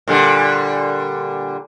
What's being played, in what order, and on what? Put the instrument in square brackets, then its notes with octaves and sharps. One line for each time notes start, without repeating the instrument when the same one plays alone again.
[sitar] A#2 D3 G3